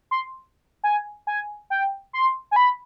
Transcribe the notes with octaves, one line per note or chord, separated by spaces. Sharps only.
C6
G#5
G#5
G5
C6
G#5
B5